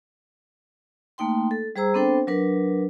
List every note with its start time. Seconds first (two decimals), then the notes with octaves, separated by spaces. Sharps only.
1.18 A3 A#3 D#4 G5 C6
1.51 A4
1.76 G3 G#4 C5 A#5 E6
1.94 B3 C4 D4 A4 C5 G5
2.27 F#3 D4 A#4 B4